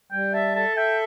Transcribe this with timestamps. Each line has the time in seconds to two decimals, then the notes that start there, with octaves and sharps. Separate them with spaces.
0.12 G3 G5
0.33 E5 A5
0.55 A4 A5
0.77 E5 G5